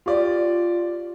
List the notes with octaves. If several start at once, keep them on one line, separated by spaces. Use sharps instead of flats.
F4 G4 D5